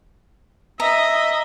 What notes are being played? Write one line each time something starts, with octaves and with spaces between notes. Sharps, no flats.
D#5 E5 A#5